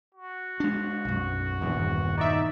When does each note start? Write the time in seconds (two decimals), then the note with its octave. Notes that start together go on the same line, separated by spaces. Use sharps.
0.15 F#4
0.60 G#3 D4
1.05 B1 F#2
1.61 D#1 E2 G2
2.17 D#4 D5 E5